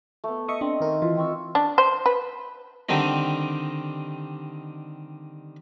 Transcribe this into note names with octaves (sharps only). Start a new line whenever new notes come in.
A3 B3
D#5 E5 C#6 D#6
C4 D4
D#3 A#4
E3 F4
C4 C#6 E6
D4
C5
B4
D3 D#3 G3 C4 D#4